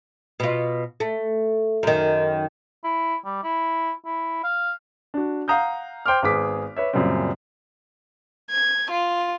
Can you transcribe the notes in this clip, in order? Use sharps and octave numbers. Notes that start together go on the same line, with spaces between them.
B2 F4
A3
F#2 D#3
E4
G3
E4
E4
F5
D4 F#4
F5 F#5 A#5 D#6 G6
C5 G5 C6 D6 F6
G#1 B3 G#4 D6 B6
B4 C#5 E5
F#2 A#2 C#3 G3 C4
G#6
F4